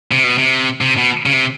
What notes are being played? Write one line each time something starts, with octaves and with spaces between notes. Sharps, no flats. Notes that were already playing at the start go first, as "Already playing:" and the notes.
C3
B2
C3
C3
B2
C#3
C3